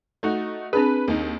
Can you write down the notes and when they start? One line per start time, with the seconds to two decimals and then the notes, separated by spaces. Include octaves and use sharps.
0.23 A3 D#4 F#4
0.73 C4 D4 G#4 B4
1.08 D#2 D#4